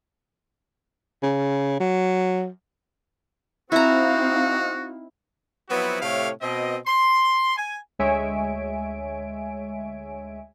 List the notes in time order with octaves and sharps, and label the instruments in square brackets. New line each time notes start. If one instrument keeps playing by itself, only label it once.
[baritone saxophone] C#3
F#3
[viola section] C4 D#4 F5 [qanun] E4 A#5 [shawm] F#4
[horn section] F3 F#3 B3 C4 E4 F#4
A2 C3 A3 G4 C#5 F5
B2 C4 D#5
C6
G#5
[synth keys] D2 G#3 C#5 E5 G#5 D7